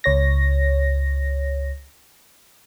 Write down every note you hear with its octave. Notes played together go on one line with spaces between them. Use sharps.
C#2 C#5 A#6